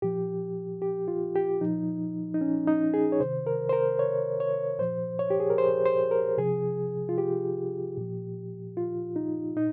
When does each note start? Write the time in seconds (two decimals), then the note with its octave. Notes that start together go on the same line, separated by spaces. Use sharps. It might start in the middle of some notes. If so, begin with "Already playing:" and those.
0.02 A#2 F3 G4
0.82 G4
1.08 F4
1.35 G4
1.61 A#2 F3 D#4
2.34 D#4
2.41 C#4
2.67 D#4
2.94 G#4
3.12 C#5
3.20 C3 D#3 C5
3.47 A#4
3.69 C5
3.73 A#4
3.99 C#5
4.40 C#5
4.79 A#2 F3 C5
5.19 C#5
5.30 G4
5.40 G#4
5.50 A#4
5.58 C5
5.86 C5
6.11 A#4
6.38 C3 F3 G#4
7.09 F4
7.18 G4
7.97 A#2 F3
8.77 F4
9.16 D#4
9.56 A#2 D#4